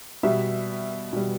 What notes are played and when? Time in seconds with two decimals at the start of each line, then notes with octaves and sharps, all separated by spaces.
0.23 B2 G3 E5
1.13 B2 G3